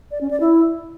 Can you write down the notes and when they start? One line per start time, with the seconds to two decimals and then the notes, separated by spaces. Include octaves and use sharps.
0.11 D5
0.21 C#4
0.31 D5
0.40 E4